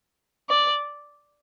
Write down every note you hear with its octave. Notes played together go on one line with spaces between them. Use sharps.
D5